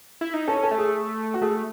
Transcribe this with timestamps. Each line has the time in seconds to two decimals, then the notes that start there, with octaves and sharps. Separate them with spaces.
0.21 E4
0.34 D#4
0.48 C#4 A4
0.63 A4
0.71 A3
0.78 G#4
1.34 F#4
1.42 A3 G#4